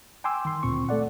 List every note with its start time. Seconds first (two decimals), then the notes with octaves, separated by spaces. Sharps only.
0.24 G5 G#5 C6 D6 E6
0.45 D#3 C6
0.63 D2 A#2 C4 C#6
0.89 A3 A4 D5 F#5